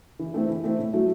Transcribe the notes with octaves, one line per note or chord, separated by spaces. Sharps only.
E3
A3 C4 E4
E3
A3 C4 E4
A2
F#3 A3 E4